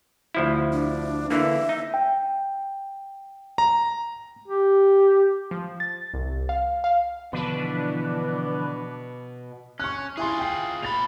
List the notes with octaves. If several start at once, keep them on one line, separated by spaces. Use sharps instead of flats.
D2 F3 E4
D4
D3 E3 A#3 E5
D#4
G5
A#5
G4
F3
A6
C2
F5
F5
B2 D3 E3 F3 D4 B4
C#4 C#6 F#6
E4 F4 G#4 G#5 C6
G5 C7
A#2 B5 A6 F7